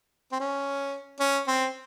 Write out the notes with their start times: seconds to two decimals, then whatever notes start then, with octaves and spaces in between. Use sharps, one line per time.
0.32 C4
0.40 C#4
1.20 C#4
1.48 C4